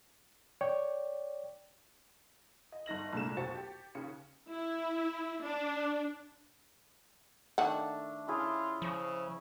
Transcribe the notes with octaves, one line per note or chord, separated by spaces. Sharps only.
C#5 D5 G5
D#5
G1 D#4 A#6 F#7
C2 A#2 D3 G#3 A3 E7
B1 F2 F#4 C5 A6 C#7
G4
D#2 C#3 C#7
E4
D4
D#3 A3 D4 F#5 A5
C#4 E4 F4 G#4
C#3 F3